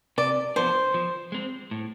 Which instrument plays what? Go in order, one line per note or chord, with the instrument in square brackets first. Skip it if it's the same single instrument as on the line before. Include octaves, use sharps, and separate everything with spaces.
[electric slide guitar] C3 [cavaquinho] D5
[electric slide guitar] F3 B3 D4 [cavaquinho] C5
[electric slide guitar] F3
G#3 C4
A2